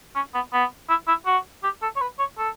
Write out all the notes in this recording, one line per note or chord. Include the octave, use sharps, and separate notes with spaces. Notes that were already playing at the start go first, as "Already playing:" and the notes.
C#4
B3
B3
E4
E4
F#4
G4
A4
C#5
B4
C#5
A4